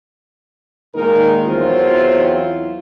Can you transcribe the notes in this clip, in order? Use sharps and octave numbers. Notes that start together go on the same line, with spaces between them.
A#2 D#3 G#3 A#3 D#4 A#4
E2 F#3 C4 E4 F4